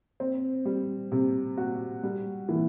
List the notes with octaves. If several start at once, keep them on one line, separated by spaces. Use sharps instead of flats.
C4
G3
C3
F#4
G3
E3